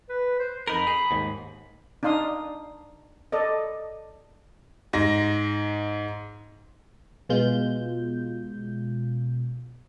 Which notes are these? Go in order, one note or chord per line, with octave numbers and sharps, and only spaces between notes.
B4
C5
F2 D#4 A#4 B5
G#4
D#2 G#2
D4 D#4 F5 C6 D#6
A4 D5 D#5
G#2 A#6
B2 G#3 F4 G6